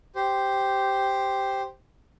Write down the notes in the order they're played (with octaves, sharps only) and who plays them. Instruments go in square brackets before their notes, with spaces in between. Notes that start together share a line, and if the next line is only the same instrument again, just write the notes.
[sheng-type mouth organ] G4 C5